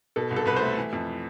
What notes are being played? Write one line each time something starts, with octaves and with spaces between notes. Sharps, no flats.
B2 A4
C2
A4
C2 B4
C5
A3 E5
E3
F2